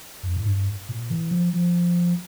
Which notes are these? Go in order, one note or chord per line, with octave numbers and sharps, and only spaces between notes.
F2
A2
G2
A#2
E3
F3
F3